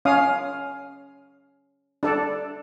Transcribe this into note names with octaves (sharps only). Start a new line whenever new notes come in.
C#4 F5 D#6
D4 A4 D5